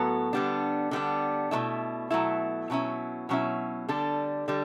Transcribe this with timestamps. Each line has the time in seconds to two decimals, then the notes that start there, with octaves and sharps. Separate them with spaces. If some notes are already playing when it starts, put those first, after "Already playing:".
Already playing: A2 F#3 B3 F#4 A4
0.33 D3 G3 B3 D4
0.91 D3 G3 B3 D4
1.51 B2 F#3 A3 E4
2.10 B2 F#3 A3 E4
2.70 B2 F#3 C#4 E4
3.29 B2 F#3 C#4 E4
3.89 D3 G3 D4 A4
4.48 D3 G3